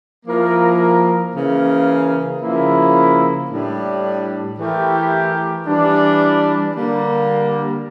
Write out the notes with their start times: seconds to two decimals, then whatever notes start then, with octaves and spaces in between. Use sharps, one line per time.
0.25 F3 A#3 E4 A#4
1.33 C#3 E3 A#3
2.42 C#3 F3 A#3 E4
3.49 A2 G3 D4
4.58 E3 A3 E4 G4 A#4
5.67 E3 G3 D4
6.75 D3 G3 A#3